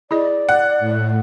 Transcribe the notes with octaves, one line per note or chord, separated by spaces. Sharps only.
E4 G#4 D5 D#5
F#5
A2